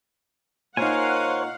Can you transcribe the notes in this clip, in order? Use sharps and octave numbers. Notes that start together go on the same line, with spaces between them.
A#2 D#4 A#4 C5 C#5 F5 F#5 G#5